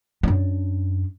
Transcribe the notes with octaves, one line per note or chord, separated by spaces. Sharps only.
F#2 D4